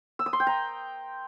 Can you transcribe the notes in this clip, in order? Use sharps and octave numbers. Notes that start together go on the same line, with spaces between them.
E6
D#6
C6
G5
A#5